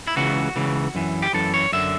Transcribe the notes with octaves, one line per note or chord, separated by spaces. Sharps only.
E4
C#2 C#3 E3 F#4
C#2 C#3 E3
F#2 E3
G4
F#2 E3 A4
C#5
F#2 D3 E5